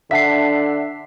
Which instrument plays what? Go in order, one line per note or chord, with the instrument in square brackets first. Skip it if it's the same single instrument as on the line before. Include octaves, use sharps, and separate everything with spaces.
[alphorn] D3 [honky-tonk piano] E5 F#5 A5 [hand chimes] B6 C7